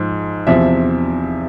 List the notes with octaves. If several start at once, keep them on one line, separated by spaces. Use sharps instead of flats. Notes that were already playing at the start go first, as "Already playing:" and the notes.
Already playing: G#2 F3
E2 C3 F3 E5